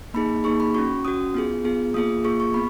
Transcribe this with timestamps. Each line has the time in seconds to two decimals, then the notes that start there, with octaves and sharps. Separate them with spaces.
0.14 A#3 D#4 G#4 B5
0.44 A#3 D#4 G#4 C#6
0.60 B5
0.75 C#4 F#4 C#6
1.05 C#4 F#4 D#6
1.34 B3 F4 G#4
1.64 B3 F4 G#4
1.94 A#3 F4 G#4 D#6
2.24 A#3 F4 G#4 C#6
2.40 C#6
2.54 B3 B5